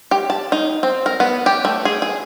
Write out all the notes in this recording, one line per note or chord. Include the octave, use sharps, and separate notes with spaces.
G4
A5
D#4
C4
A#4
B3
G4
A3
G#4
G#4